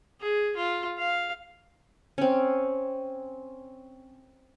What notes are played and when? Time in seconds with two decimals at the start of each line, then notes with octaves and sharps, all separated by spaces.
0.21 G#4
0.56 F4
0.98 F5
2.18 C4 C#4